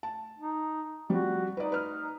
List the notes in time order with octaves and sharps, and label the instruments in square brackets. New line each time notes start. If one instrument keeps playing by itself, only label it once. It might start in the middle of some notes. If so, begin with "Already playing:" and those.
[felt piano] A5
[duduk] D#4
[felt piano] F3 G3 C4 [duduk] F#4
[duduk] D#4 [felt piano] B4 D5
[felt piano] B4 F6